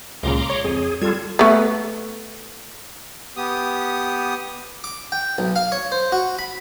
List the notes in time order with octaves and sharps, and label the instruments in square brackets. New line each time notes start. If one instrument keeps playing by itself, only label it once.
[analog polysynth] C#2 A#2 C#3 [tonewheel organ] A#5 C6 D6
[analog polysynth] C#5
[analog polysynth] F2 [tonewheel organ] G#4
[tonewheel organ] G3 F4 A4 [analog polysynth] G#6
[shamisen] A3 B3
[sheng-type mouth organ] B3 G4 D#6
[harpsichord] D6
G5
B1
F5
C#5
C5
F#4
B5